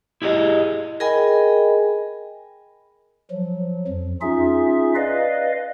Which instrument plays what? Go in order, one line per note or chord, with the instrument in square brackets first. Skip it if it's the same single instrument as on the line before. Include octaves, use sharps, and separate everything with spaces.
[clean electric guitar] E4 G4 G#4 C#5 D#5
[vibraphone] G#4 A#4 D#5 G5 G#5 B5
[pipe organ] F3 F#3
F2
C#4 D#4 F4 G#4 E5
B4 D5 D#5 F5